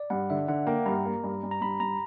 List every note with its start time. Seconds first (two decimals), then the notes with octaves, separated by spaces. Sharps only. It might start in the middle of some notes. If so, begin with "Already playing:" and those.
Already playing: D5
0.10 G2 F#5
0.30 D3 E5
0.48 D3 F#5
0.67 A#3 G5
0.86 G2 A#5
1.05 A#3
1.24 G2
1.43 G2
1.51 A#5
1.61 G2 B5
1.80 G2 A#5